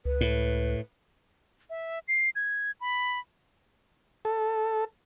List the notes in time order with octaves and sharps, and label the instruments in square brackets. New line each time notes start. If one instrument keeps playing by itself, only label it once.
[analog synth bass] C#2 [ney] B4
[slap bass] A2
[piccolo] E5
C7
G#6
B5
[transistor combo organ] A4